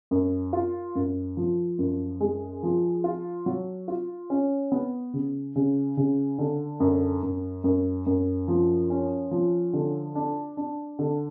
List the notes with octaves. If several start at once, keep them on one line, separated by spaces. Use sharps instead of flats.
F#2
F4
F#2
F3
F#2
G#3
F3
F4
F#3
F4
C#4
B3
C#3
C#3
C#3
D3
F#2
F#2
F#2
F#2
F3
C#4
F3
D3
D4
D4
D3